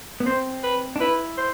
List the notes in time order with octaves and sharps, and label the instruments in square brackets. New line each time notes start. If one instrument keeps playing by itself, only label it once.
[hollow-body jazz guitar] B3
[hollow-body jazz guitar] C4 [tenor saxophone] C5
[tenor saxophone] B4
[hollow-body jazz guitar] D4
[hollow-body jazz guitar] E4 [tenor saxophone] B4
[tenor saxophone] C5